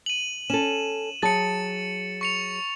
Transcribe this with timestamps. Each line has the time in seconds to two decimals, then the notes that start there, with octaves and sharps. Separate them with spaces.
0.06 D#7 F#7
0.50 C#4 A4 E7
1.22 F#3 G#4 A5 A6 C#7
2.21 C#6 C#7 F7